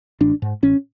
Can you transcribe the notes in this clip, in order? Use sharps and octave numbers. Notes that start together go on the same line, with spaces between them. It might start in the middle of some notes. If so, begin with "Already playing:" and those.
A1 D4
G#2
A1 C#4